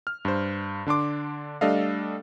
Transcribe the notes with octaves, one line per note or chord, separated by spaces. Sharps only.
F6
G2 C5
D3 D4 C6 D6
G3 A3 D4 A4 D#5 F5